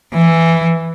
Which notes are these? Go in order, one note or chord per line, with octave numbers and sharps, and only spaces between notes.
E3